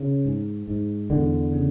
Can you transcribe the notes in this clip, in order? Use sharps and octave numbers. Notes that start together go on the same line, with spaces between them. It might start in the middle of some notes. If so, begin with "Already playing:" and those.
Already playing: C#3
G#2
G#2
E2 D3
C#3